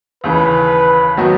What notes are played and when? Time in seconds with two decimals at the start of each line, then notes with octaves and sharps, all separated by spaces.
0.24 D#2 C#3 E3 B4
1.17 D#3 F#3 B3 F#4